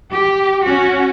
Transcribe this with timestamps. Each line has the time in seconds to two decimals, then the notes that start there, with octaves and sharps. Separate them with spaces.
0.12 G4
0.64 C#4 F#4